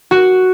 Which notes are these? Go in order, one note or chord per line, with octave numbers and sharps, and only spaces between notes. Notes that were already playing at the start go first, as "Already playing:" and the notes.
F#4